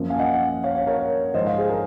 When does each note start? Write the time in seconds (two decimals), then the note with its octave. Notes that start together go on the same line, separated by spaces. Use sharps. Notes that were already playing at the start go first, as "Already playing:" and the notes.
Already playing: F#2 F3 A#3
0.10 F5 G#5
0.19 D#5 F#5
0.64 C#5 F5
0.75 C#5 F5
0.87 A#4 C#5
1.34 G#2 F3 G#3 C5 D#5
1.46 C#5 F5
1.58 G#4
1.69 A#4